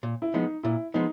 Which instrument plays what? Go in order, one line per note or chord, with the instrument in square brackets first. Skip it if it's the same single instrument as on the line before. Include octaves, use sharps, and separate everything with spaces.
[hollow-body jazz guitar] A#2
[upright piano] E4
[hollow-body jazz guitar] F3 G#3 B3 [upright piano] D#4
[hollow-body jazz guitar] A#2 [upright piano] E4
[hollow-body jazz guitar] F3 G#3 B3 [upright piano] D#4